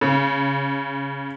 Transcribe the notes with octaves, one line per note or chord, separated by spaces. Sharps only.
C#3